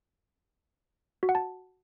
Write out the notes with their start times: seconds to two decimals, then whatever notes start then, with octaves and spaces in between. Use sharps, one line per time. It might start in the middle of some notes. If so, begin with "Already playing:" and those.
1.23 F#4
1.29 F#5
1.35 A5